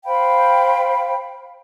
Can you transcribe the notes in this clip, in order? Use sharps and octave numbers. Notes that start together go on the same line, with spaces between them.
C5 F5 G5 B5